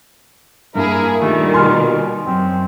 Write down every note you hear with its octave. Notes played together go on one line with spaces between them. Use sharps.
G2 A#3 E4 G#4 A#4
A#2 D#3 G3 A3
B2 G#5 C6 F6
F#2 C4